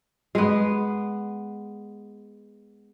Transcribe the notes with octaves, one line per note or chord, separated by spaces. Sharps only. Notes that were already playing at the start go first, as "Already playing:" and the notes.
G#3 B3